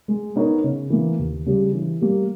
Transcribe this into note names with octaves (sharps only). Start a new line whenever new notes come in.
G#3
B3 D#4 A#4 C#5
C#3
E3 A#3
D#2
C#3 G3
E3
G3 A#3